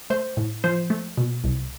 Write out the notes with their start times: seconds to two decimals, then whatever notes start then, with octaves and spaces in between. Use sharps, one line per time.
0.10 A3 C5
0.37 A2
0.64 F3 C5
0.90 A3
1.17 B2
1.44 C2